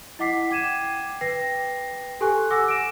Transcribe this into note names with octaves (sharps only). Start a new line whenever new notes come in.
E4 D#5 F#5 D6 B6 C7
G5 D6 G#6 D#7 E7
B4 G5 A#6 C7
G4 A4 G#5 C#6 F#6
F#5 G#5 D6 E6 A#6
D7 E7